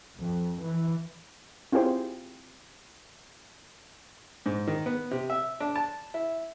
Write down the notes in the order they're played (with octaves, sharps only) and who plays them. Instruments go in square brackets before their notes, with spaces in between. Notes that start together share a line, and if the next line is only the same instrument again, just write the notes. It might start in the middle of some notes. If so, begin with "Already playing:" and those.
[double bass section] F2
E3
[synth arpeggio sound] C4 E4 F4 G4 G#4 C5
[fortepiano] G#2
D#3
B3
C3
E5
D4
A5
E4